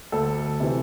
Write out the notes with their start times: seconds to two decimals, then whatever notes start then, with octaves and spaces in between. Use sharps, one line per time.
0.12 D2 A4
0.60 C3 E3